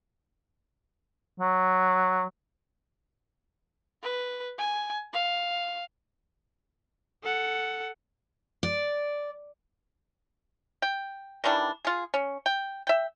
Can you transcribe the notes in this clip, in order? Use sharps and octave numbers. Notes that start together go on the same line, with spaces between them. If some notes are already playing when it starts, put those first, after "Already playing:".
F#3
B4
G#5
F5
A4 F#5
D5
G5
D#3 E3 G3 D4
F4 G#4
C#4
G5
E5 G5